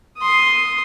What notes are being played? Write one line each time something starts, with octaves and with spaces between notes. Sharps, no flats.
C6 D#6